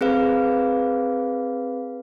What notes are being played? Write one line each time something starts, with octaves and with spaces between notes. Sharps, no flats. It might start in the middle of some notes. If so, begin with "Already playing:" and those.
C4 G#4 B4 F5